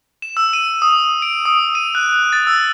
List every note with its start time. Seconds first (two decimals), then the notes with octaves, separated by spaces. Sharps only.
0.22 E7
0.37 E6
0.53 D#7
0.82 D#6
1.22 D7
1.45 D#6
1.75 D#7
1.95 F#6
2.33 A6
2.47 E6